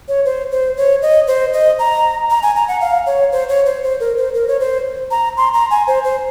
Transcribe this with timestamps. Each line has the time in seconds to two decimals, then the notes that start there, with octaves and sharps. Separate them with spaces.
0.08 C#5
0.25 C5
0.52 C5
0.77 C#5
1.02 D#5
1.28 C5
1.53 D#5
1.79 A#5
2.30 A#5
2.43 G#5
2.56 A#5
2.68 F#5
2.81 F5
3.07 C#5
3.32 C5
3.49 C#5
3.66 C5
3.83 C5
4.00 A#4
4.17 C5
4.34 A#4
4.48 C#5
4.60 C5
5.11 A#5
5.37 C6
5.54 A#5
5.71 G#5
5.87 C5
6.04 C5